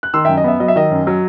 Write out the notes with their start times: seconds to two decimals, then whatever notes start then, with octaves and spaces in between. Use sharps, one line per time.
0.03 F#6
0.14 D#3 C6 E6
0.25 E5 G5
0.29 F#2
0.37 D#5
0.44 B3 E5
0.60 F#3 D#5
0.68 E5
0.76 D#3 D#5
0.91 F#2
1.07 F#3